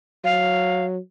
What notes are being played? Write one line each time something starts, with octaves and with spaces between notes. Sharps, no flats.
F#3 F5